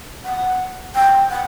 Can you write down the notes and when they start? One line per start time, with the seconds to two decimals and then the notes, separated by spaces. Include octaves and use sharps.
0.25 F#5
0.95 G5
1.30 F#5